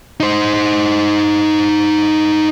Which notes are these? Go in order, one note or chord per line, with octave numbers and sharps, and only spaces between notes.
D#4 C5